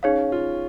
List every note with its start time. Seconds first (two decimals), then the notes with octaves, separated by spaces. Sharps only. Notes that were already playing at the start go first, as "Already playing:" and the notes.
0.03 C#4 D#4 G#4 C#5 F5
0.32 F4